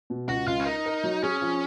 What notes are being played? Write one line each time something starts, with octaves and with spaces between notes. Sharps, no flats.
B2
C#2 F#4
C#2 F4
C#4
D#4 A#4
A#4
F#3
C#4 G#4
F3